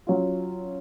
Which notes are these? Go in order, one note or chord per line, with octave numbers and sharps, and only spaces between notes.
F#3 C#4 F4